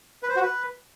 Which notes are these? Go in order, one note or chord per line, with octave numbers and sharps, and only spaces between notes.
B4
C5
F#4
B4